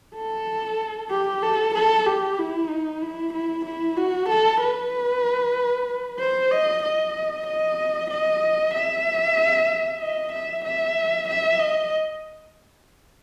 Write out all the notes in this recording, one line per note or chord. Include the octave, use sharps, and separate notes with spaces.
A4
G4
A4
A4
G4
E4
D#4
E4
E4
E4
F#4
A4
B4
C5
D#5
D#5
D#5
D#5
E5
D#5
E5
E5
E5
D#5